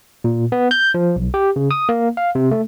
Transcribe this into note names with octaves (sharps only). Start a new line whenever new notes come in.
A#2
B3
G6
F3
B1
G4
C#3
D#6
A#3
F5
C3
A3